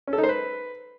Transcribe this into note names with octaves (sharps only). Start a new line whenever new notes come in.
C#4
A4
D#4
C5
B4